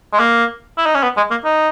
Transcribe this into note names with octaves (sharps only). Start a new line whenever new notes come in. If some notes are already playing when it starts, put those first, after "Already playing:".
G#3
A#3
E4
D#4
C#4
B3
G#3
A#3
D#4